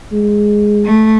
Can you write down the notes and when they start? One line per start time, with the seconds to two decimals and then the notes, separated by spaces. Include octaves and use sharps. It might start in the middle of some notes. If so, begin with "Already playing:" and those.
0.12 G#3
0.85 A3